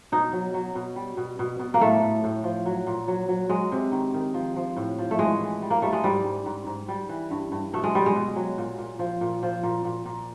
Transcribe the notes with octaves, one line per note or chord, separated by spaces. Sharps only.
B2 D#4
F#3
F#3
B2
G3
B2
B2
B2
A#3
A2 A3
A2
A2
F3
F#3
A#2
F#3
F#3
F#3 G#3
C3
D#3
D#3
F3
F3
A2
F3
A3
E3 G#3
E3
G3
A#3
G3 A3
G#3
G#2 G3
G#2
G#2
G#2
G3
E3
G2
G2
B2 A3
G#3
B2 G3
G#3
B2
F#3
A#2
A#2
F3
A#2
F3
A#2
A#2
A#2